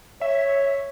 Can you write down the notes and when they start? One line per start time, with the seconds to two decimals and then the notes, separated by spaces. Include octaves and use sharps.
0.21 C#5 E5